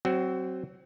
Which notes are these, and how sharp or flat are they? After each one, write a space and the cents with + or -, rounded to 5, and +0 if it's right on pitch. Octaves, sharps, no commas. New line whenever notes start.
F#3 +20 C4 +0 F#4 +20